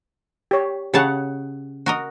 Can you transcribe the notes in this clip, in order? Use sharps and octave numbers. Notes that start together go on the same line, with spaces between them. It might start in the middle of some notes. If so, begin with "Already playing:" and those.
G4 C#5
C#3 G4 G#4 C#5 F#5 A5
F#4 A#4 D#5